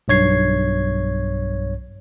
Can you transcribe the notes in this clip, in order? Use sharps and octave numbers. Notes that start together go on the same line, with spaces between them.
B1 G2 C#5 G#6 C7